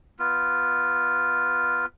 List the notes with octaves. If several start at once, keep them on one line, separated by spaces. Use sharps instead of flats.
B3 F4